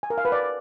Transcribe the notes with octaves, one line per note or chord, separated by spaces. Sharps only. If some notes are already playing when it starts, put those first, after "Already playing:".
G#5
A#4
F5
B4
D5